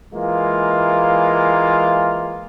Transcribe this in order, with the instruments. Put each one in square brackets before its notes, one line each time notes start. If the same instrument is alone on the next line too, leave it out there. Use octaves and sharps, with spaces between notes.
[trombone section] E3 G#3 A#3 F4